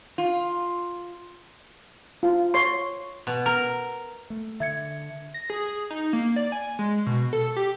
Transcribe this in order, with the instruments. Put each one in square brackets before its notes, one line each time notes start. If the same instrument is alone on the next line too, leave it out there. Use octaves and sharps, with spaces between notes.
[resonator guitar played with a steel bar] F4
[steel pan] F4
C#5 C6
[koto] B2
A#4
[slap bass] A3
[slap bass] D3 [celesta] E5 G#6 C#7
[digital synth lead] A#6
G#4
D#4
A#3
D5
G#5
G#3
B2
A4
G4